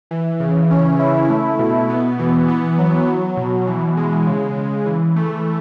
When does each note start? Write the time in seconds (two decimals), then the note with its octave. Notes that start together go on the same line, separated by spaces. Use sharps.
0.11 E3
0.40 C#3
0.71 C#4
0.99 E4
1.30 A3
1.59 B2
1.90 B3
2.19 E3
2.48 B3
2.78 F#3
3.08 F#3
3.37 B2
3.67 E3
3.97 G#3
4.27 C#3
4.56 C#3
4.86 E3
5.16 A3